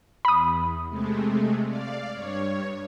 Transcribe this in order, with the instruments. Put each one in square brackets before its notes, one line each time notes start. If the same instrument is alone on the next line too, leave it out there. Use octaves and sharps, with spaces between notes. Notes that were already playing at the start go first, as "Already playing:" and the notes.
[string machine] E2 [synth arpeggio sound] B5 D#6
[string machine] C3 G#3 A3
D5 F5
G2 C#5